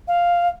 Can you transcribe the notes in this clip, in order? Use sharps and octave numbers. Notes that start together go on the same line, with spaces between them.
F5